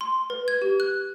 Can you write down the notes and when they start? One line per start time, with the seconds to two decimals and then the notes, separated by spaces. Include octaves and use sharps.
0.01 C6
0.30 B4
0.48 G#6
0.62 G4
0.80 F#6